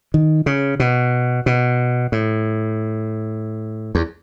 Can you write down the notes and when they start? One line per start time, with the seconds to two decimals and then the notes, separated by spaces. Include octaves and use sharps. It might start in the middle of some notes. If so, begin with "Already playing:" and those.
0.14 D#3
0.46 C#3
0.80 B2
1.46 B2
2.12 A2
3.95 E2